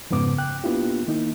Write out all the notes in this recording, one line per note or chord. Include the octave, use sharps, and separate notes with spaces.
F2 G#2 C#3 B3 D6
G5 F#6
A#3 B3 D4 E4 F4 G4
D#3 A#3 D#4 E4